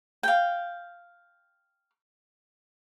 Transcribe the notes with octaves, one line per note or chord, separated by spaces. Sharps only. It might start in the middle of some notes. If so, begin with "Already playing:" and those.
F5 G5